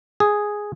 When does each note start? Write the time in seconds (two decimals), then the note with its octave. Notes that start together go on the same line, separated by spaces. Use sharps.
0.20 G#4